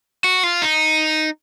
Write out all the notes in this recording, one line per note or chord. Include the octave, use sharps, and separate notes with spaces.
F#4
F4
D#4